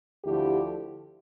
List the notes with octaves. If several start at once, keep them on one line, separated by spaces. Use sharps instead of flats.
D2 D3 F3 E4 G4